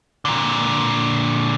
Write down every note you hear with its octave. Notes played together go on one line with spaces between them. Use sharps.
A#2 D3